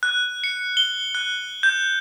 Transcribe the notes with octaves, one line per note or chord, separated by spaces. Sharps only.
F#6
C#7
G7
F#6
G6